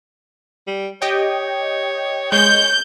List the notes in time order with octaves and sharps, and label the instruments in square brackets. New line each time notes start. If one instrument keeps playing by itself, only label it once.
[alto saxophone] G3
[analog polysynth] G4 D#5 G5 [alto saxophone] C#5
[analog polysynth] G#3 [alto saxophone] C#5 [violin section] G6